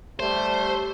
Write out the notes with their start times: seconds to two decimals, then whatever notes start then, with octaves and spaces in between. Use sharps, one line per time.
0.20 G3 A3 C5